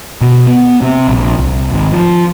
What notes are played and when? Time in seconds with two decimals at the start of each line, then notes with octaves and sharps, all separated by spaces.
0.21 B2
0.47 B3
0.82 C3
1.08 A#1
1.39 C2
1.72 G#1
1.93 F3